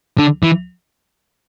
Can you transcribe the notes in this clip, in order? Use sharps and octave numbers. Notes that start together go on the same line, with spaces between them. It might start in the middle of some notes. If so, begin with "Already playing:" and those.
D3
E3